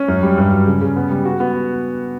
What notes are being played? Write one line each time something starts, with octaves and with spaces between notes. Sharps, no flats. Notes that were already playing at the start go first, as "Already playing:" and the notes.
Already playing: C#4
F#2
G3
G2
F#3
C#3
C#3
B3
G3
F#4
B3